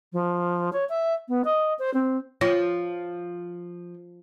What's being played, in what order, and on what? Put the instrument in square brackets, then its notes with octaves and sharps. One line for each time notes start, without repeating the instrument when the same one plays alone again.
[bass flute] F3
C#5
E5
B3
D#5
C5
C4
[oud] F3 [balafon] F4 C#5